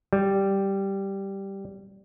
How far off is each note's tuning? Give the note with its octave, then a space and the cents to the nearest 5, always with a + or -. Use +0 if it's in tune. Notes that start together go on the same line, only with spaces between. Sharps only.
G3 -5